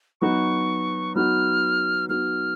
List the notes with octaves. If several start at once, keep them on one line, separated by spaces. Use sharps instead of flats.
F#3 B3 D#4 F#4 C#6
F#3 B3 D#4 F#4 F6
F#3 B3 D#4 F#4 F6